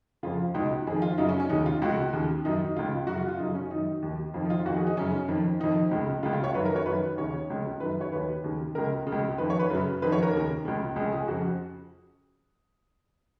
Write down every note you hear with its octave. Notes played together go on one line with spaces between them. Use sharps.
F2 C#3 F4
C#2 B2 D#4
F2 D#3 G#4
F4
F#2 C#3 D#4
C#4
C#4
D#2 C#3 D#4
F4
C#2 C#3 F#4
D#2 C#3
F#2 D#3 D#4
D#4
C#2 C#3 F4
F#2 C#3 F#4
F4
F4
F#2 C#3 D#4
C#4
F#2 D#3 D#4
D#2 D#3
F2 D#3 F4
D#4
F4
F2 D#3 F#4
G#4
D#4
F#2 C#3 C#4
F2 D#3
F2 D#3 D#4
C#2 C#3
C#2 C#3 F4
F4
C#5
F#2 D#3 B4
A#4
C#5
F#2 D#3 B4
D#2 C#3 C#5
C#2 C#3
F#2 D#3 B4
C#5
D#2 D#3 B4
D#2 C#3
C#2 C#3 A#4
C#3
C#2
F2 D#3 B4
C#5
B4
F#2 C#3 B4
F2 D#3 B4
C#5
A#4
D#2 C#3
C#2 C#3
C#2 C#3 G#4
G#4
F2 C#3 F#4